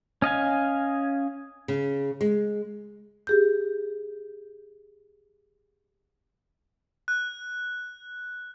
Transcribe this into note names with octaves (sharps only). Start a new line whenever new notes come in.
C#4 D#5 F5 G#5
C#3
G#3
G4 G#4 G6
F#6